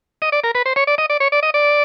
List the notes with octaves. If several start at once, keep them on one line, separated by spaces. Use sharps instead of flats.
D#5
D5
A#4
B4
C5
C#5
D5
D#5
D5
C#5
D5
D#5
D5